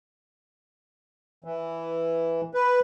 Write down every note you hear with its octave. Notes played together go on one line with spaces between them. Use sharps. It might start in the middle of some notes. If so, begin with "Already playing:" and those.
E3
B4